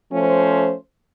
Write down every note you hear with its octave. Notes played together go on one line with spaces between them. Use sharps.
F3 A3 C#4 C5